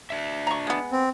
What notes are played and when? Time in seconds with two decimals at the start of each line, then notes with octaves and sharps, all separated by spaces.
0.10 D4 E5
0.47 A#5 C#6
0.67 G#3 B3
0.92 C4